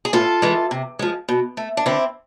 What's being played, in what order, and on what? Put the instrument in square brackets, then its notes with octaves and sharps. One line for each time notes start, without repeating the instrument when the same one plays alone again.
[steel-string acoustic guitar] G#4
A2 F4 A4
E3 G#3
C3
F3 G#3
B2
A3
D4
D3 C4 E4